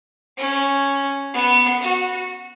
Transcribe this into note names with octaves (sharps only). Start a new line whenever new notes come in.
C#4
B3
F#4